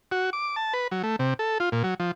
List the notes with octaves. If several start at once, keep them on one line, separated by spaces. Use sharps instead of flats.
F#4
D6
A5
B4
F#3
A3
C3
A4
F4
A#2
F#3
F3